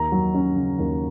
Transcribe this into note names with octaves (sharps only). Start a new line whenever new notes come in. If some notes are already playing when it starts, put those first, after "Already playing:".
Already playing: D#2 A#5
F#3
C#4
C#3
D#2